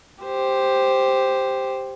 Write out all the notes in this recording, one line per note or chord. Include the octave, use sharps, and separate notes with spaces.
G4 C5